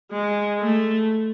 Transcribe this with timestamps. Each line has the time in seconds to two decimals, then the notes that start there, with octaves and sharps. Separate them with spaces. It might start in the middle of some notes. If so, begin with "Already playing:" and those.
0.11 G#3
0.61 A3